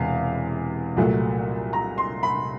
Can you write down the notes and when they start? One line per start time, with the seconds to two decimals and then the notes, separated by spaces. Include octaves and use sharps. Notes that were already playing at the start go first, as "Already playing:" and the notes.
Already playing: E1 E2 C3 E3 F5
0.96 C2 A#2 F#3 A3
1.73 A#5
1.98 C6
2.23 B5